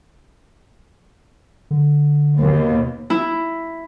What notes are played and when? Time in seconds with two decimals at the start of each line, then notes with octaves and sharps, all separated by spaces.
1.71 D3
2.38 D#2 B2
3.10 E4